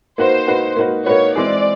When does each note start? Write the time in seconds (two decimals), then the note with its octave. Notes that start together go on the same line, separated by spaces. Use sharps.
0.18 A#3 D#4 F#4 B4 C5
0.47 A#3 D#4 F#4 B4
0.76 A#3 D#4 F#4 B4
1.06 A#3 D#4 F#4 B4 C#5
1.35 E3 G#3 C4 E4 G#4 D5